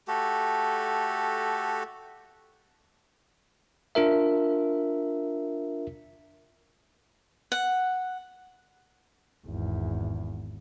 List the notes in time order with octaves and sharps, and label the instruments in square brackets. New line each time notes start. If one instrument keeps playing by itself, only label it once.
[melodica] A3 F#4 G4 A4
[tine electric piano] D4 F4 A#4 E5
[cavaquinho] F#5
[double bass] G#1 E2